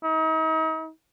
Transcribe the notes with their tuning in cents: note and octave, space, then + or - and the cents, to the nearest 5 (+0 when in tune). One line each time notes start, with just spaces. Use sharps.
D#4 +40